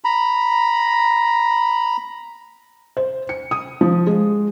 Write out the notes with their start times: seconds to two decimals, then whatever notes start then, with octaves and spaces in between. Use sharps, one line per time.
0.04 A#5 B5
2.97 C5
3.29 C#7
3.51 D#6
3.81 F3
4.07 G#3